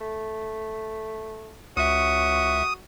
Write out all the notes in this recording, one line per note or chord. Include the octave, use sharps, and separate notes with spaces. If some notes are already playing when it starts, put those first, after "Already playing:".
A3
C#2 C#4 F#4 E5 D#6